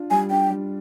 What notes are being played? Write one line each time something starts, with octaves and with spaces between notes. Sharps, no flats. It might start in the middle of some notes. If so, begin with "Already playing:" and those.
Already playing: D4 F4
G3 G#5
D4 G5
G3